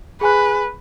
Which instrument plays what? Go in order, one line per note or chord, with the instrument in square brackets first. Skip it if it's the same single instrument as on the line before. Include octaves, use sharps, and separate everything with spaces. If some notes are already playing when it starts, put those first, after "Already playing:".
[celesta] G#4 G#5 F#6 [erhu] B4